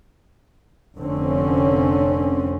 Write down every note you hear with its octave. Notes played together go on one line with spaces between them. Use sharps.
F1 D3 C4 C#4